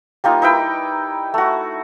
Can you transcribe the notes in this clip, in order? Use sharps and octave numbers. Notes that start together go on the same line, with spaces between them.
G3 A#3 D#4 F4
D#4 E4 B4 G5
A3 F#4